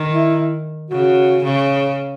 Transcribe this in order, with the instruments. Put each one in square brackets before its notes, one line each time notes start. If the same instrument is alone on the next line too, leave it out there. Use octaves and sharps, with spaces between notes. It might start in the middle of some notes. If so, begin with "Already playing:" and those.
Already playing: [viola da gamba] D#3
[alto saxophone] E4
[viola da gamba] C#3 [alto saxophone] F#4
[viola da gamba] C#3